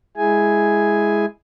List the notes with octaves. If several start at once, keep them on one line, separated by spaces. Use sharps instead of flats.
G#3 E4 G#4 G#5